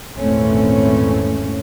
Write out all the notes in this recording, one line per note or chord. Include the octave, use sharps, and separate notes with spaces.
G#1 E2 A#2 A3 C4 C#4